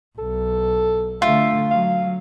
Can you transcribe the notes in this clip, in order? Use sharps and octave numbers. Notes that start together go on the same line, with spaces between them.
B1 A4
D3 A3 F4 E5
F#3 F5